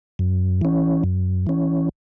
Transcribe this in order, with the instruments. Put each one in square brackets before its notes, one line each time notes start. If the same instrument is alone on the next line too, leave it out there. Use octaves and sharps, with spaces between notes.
[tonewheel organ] F#2
E3 C#4
F#2
E3 C#4